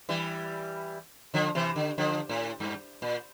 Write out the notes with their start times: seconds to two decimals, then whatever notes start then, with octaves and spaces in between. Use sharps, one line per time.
0.09 E3 G3
1.34 D3 F3
1.55 C3 E3
1.76 D3
1.98 D3 F3
2.29 A2
2.60 G2
3.02 A#2